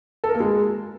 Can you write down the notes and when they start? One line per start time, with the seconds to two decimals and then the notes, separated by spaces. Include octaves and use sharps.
0.24 A4
0.29 A#4
0.35 A#3
0.40 G#3